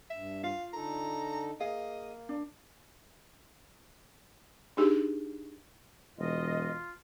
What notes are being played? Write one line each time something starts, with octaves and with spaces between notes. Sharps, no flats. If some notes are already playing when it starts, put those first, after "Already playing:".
G2 E5
F4 F5
D3 D#4 A4 A#5
A#3 G#4 D#5 F5
D4
D4 D#4 G4 G#4
E1 F4 D#5